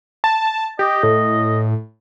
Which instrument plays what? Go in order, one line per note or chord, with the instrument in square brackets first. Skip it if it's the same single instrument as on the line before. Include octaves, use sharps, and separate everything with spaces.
[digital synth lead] A5
[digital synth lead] G4 [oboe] D#5
[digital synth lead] A2